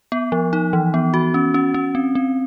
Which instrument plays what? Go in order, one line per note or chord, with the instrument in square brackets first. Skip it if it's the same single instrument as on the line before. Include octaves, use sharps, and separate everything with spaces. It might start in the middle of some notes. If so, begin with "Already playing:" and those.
[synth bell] B3
F3
D#4
E3
B3
F#4
C#4
C#4
C#4
C4
C4